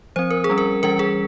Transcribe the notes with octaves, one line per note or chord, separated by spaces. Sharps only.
F3 C4 C5
A#4
G#4
G3 C#4
A#4
E3 G3 C#4 A#4
G#4